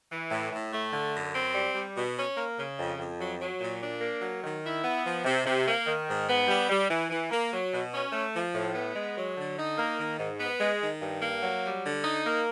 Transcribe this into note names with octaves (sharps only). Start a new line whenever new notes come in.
E3
A2
A2
A3
D3
F#2
C4
G3
G3
B2
C#4
A#3
C#3
F2
F2
F#3
F#3
A#2
D4
A#3
F#3
D#3
E4
B3
F3
C3
C3
A#3
D#3
G#2
B3
G3
G3
E3
E3
A#3
F#3
B2
C#4
A3
F3
A2
B3
G#3
F#3
D3
D#4
A#3
D#3
G#2
B3
G#3
D#3
G2
A#3
F#3
G3
D3
D#4
A#3